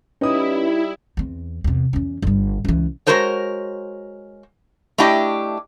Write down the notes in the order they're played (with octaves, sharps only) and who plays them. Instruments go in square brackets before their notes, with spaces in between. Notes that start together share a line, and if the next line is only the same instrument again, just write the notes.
[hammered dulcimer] G3 [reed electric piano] C#4 B4 [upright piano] D#4 D#6 [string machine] E4
[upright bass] E2 C4
E2 C3
E2 C#4
G1 G3
C#2 E3
[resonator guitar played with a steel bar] G#3 B3 F#4 A#4 C5 C#5
A3 D4 E4 G4 D#5 G5